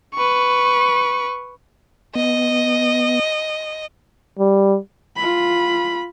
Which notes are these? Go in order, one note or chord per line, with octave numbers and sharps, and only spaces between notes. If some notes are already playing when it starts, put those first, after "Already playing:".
B4 C#6
B3 D#5
G3
F4 B5